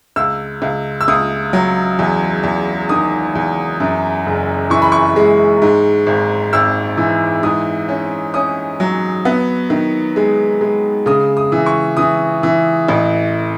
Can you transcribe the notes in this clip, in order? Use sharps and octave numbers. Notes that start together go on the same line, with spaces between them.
C#2 E6
C#2
E6
C#2 D#6
F#3
E2
E2
D#3 D#6
E2
F#2
F#1
E3 C#6
B5
C#6
G#3
G#2
G#1
G#1 E6
E3
G#2 D#6
C#4
C#4 D#6
F#3
B3
D#3
G#3
G#3
C#3 D#6
D#6
E3
C#6
E3 D#6
E3
A1